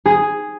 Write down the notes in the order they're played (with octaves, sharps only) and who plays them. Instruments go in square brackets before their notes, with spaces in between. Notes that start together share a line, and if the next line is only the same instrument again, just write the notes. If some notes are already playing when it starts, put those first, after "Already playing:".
[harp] G#4